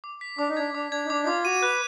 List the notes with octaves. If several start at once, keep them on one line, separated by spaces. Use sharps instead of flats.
D6
B6
D4 D6
D#4
D4 G#6
D4 D6
D4 G#6
D#4
D4 D6
D#4
F4 D6
F#4 D#7
B4 F#6